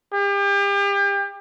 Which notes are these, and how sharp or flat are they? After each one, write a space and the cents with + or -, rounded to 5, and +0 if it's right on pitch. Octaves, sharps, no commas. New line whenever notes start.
G4 +35